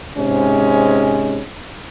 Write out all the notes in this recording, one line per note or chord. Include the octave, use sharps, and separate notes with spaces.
G#2 C3 G#3 C#4